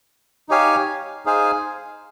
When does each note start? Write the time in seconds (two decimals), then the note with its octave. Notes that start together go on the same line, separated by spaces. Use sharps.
0.49 D#4 G4 C#5 F5 G#5
1.25 D#4 G#4 C5 F5 G#5